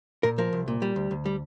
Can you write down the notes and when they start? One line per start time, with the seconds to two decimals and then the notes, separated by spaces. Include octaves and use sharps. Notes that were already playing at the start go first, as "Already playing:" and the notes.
0.23 A#2 A#4
0.38 F3 A#4
0.53 C2
0.68 A#2
0.82 G3
0.96 D2
1.11 D2
1.26 G3